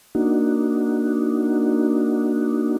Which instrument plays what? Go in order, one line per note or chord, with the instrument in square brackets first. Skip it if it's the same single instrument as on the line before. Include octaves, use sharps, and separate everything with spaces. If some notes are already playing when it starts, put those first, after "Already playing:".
[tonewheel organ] A#3 D4 D#4 F#4